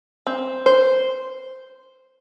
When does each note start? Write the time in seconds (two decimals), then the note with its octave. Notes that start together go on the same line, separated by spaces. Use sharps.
0.27 C4
0.66 C5